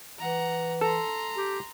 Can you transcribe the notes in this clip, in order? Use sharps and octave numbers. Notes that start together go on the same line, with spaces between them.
E3 F#5 A#5
A4 A#5 C6
G4